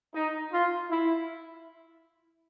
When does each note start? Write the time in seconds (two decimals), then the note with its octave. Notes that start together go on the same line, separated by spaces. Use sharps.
0.15 D#4
0.53 F4
0.91 E4